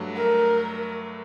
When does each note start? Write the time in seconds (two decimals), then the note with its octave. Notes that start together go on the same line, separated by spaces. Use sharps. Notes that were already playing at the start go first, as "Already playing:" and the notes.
Already playing: G2 F#3 A3 D4
0.16 A#4